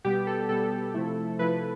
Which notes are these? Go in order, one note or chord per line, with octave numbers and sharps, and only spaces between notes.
B2 G3 B3 G4
A4
B2 G3 B3 A4
C3 F3 A3 E4
C3 F3 A3 E4 B4